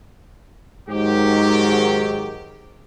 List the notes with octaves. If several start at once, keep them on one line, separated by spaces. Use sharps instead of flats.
G#2 D#3 F#3 G4